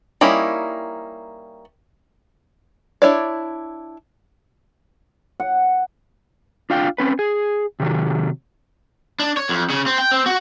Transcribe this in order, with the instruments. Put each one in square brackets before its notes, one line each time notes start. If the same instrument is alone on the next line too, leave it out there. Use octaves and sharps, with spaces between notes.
[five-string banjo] G3 A#3 C#4 D#4 E4
D4 E4 C#5 D5
[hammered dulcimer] F#5
[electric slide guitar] D4 F4 F5 G5
C4 C#4 B4
G#4
C3 D#3 F#3
[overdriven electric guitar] D4
C#5
F2
C#3
C4
G5
C4
F#4